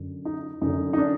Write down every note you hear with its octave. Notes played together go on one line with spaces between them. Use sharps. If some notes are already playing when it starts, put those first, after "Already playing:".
Already playing: F#2 D3
D#4
F#2 D3 D#4
D#4
D4